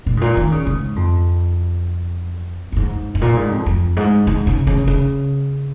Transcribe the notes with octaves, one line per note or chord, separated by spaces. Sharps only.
A#2
G#2
A#2
D#3
C#3
G#2
F2
F2
G#2
G#2
A#2
G#2
F2
F2
G#2
G#2
C#3
C#3
C#3